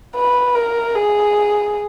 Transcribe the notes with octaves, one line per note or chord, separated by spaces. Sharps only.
B4
A#4
G#4